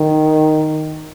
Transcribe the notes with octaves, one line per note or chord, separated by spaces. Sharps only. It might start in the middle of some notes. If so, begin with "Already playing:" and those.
Already playing: D#3